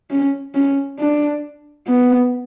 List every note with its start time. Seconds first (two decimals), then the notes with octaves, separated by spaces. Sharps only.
0.11 C#4
0.55 C#4
0.99 D4
1.87 B3